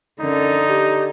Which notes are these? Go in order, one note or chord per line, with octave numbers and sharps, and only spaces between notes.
F#2 D3 D#4
G4